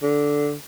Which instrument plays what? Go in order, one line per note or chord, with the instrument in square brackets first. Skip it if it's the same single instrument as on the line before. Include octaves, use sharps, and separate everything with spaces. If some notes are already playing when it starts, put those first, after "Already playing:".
[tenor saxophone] D3